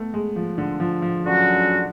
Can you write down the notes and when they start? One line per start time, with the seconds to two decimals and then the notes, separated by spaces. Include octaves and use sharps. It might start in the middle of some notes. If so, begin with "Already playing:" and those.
Already playing: A3 B3
0.14 G#3
0.36 F3
0.58 D3
0.80 F3
1.02 F3
1.24 D3 F#3 C#4 F#4